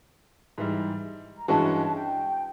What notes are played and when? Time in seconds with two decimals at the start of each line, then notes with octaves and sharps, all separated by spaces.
0.58 G#2 E3 G3
1.38 A#5
1.48 G2 E3 G#3 C#4 F#4 A5
1.94 G5